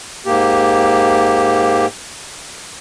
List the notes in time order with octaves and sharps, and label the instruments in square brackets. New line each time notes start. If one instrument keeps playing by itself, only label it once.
[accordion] G#2 A#3 G4